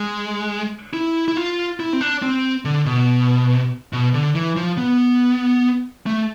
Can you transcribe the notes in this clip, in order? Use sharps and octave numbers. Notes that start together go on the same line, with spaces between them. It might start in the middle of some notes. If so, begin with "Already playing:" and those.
Already playing: G#3
E4
E4
F4
E4
C4
D4
C4
D3
B2
B2
D3
E3
F3
B3
A3